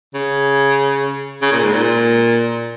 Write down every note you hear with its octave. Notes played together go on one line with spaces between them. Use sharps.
C#3
C#3
A#2
G#2
A#2